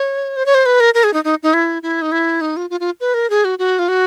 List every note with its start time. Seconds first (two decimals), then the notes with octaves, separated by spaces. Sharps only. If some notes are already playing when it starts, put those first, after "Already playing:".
Already playing: C#5
0.36 C5
0.46 C#5
0.55 C5
0.66 B4
0.80 A#4
0.94 A#4
1.04 G#4
1.14 D#4
1.24 D#4
1.43 D#4
1.54 E4
1.83 E4
2.02 D#4
2.12 E4
2.41 D#4
2.57 F4
2.70 F4
2.80 F4
3.01 B4
3.14 A#4
3.30 G#4
3.45 F#4
3.59 F#4
3.79 F4
3.88 F#4